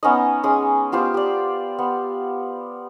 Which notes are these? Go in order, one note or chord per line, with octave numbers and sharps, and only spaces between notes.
B3 C#4 D#4 D#5
G#3 C#4 D#6
B3 F4 G4 C5
G4 D5
B3